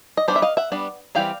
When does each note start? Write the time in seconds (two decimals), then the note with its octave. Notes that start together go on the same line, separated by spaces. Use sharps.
0.17 D#5
0.28 G3 B3 D4 C5 D5
0.36 E5
0.42 D#5 F5
0.57 E5 F#5
0.72 G3 B3 D4
1.15 E3 G3 C4 F5 G5